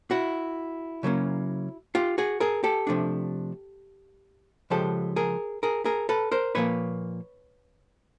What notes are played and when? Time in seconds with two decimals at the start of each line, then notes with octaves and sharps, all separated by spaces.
0.11 E4 F#4
1.03 C#3 F#3 A#3 C#4
1.95 F4 G4
2.18 F#4 G#4
2.40 G#4 A#4
2.64 G4 A4
2.87 C3 F3 A3 D4
4.70 C#3 F3 G#3 G4 A4
5.16 G#4 A#4
5.63 G#4 A#4
5.85 G#4 A#4
6.09 A4 B4
6.32 A#4 C5
6.55 A#2 F3 A#3 B4 C#5